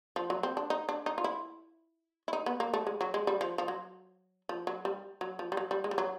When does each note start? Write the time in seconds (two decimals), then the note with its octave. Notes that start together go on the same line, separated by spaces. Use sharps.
0.16 F3
0.30 F#3
0.43 C4
0.57 D4
0.70 D#4
0.89 D4
1.06 D#4
1.18 F4
1.24 E4
2.28 E4
2.33 D#4
2.46 B3
2.60 A#3
2.74 A3
2.87 G#3
3.01 F#3
3.14 G#3
3.27 G3
3.41 F3
3.58 F3
3.68 F#3
4.49 F3
4.67 F#3
4.85 G3
5.21 F#3
5.39 F3
5.52 G3
5.57 F#3
5.71 G3
5.84 G#3
5.91 G3
5.98 F#3